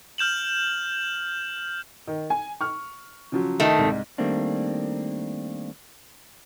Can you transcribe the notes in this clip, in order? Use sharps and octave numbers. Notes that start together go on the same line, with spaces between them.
F6 G6 E7 F#7
D#3
G#5
C#6 F6
C#3 F3 F#3
D#3 A3
C2 G#2
D#3 G3 A3 A#3 C4 D4